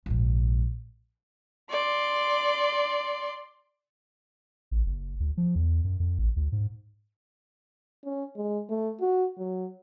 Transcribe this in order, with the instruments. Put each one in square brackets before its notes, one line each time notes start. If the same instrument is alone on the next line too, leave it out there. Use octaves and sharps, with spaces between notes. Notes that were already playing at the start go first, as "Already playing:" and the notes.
[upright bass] A#1 G#2
[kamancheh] D5 C6
[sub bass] A1
F#1
D2
F3
E2
F#2
F2
A1
D2
G#2
[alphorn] C#4
G#3
A3
F#4
F#3